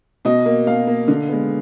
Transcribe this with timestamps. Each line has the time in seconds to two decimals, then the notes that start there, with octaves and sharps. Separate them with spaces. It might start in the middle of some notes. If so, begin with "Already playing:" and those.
0.25 B2 D#5
0.46 A#3
0.67 B2 F5
0.87 A#3
1.08 D3
1.29 G#3 B3